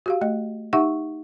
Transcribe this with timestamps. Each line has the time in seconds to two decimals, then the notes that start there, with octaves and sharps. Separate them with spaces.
0.06 F#4 G4 F5
0.21 A3 D#5
0.73 D#4 G4 E5 F#5 C#6